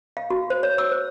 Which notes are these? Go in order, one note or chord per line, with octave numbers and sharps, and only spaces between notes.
F5
F#4
C5
C#5
E6
C5